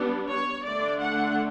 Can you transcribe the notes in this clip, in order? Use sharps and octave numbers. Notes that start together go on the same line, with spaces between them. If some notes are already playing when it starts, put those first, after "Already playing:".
Already playing: G3 B3 D4
C#5
D3 A3 D4 D5
F#5